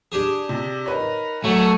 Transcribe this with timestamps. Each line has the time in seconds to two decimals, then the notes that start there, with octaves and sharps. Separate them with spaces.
0.12 D4 G4 G#4
0.49 C3
0.86 D#4 A#4 B4 C#5
1.44 F#3 A3 G#5 C#6